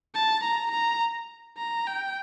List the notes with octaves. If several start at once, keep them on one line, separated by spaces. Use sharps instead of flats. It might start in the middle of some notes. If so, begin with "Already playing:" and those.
A5
A#5
A#5
A#5
G5